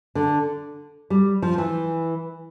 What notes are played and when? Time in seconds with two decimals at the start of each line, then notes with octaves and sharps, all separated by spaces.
0.15 D3
1.10 G3
1.42 F3
1.58 E3